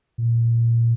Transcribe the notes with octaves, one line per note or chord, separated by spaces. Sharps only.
A#2